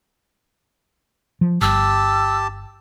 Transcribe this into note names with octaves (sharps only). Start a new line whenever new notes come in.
F3
G1 G4 A5 E6